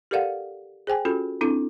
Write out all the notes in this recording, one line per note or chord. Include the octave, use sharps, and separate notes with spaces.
G4 A4 A#4 D5 F5 F#5
G#4 C5 G5 G#5
C#4 F4 F#4 A4
C4 D4 E4 A4